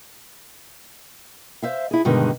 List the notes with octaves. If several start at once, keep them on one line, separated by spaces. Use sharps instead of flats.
C5 E5 F5
E4 G#4
G2 B2 D3 D#3 G#3